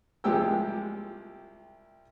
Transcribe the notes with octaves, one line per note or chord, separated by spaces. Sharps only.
C2 F3 G#3 G4 G5 E6